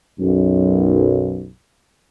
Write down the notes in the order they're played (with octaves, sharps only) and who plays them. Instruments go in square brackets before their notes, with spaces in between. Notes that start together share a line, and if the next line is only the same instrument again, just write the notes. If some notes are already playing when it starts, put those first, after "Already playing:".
[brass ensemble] B1 F#2